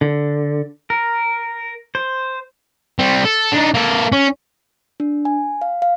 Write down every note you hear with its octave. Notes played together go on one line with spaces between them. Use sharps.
D3
A#4
C5
G3 C4
A4
D4 D#4
A#3 A4
C#4
D4
G#5
F5
F5